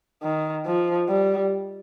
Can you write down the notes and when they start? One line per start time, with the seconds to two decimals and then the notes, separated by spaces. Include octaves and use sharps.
0.23 D#3
0.66 F3
1.08 G3